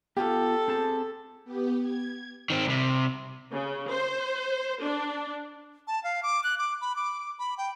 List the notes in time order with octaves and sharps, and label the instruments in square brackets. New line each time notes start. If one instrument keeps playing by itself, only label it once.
[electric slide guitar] B3 F4 [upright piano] G4 [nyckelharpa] A4
[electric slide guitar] C4 G#4 A5
[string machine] B3 G4
G#6
[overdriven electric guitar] D#3 C4
C2 C3
[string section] C#3
C5
D4
[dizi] A5
F5
D6
F#6
D6
B5
D6
B5
G5